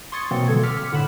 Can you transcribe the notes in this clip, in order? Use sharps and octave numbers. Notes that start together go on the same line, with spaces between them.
C6 C#6 D#6 G#6 A6 C#7
B2 E3 F#3 A#3 C4
B2 D3 G3 A4 G#6
C6 D6 E6 F6 B6 C#7
A2 D3 F#5 B5 E7